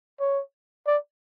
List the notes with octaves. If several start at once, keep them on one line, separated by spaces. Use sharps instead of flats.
C#5
D5